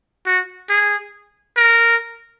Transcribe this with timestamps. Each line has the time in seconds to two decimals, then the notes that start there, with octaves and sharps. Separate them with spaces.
0.26 F#4
0.69 G#4
1.57 A#4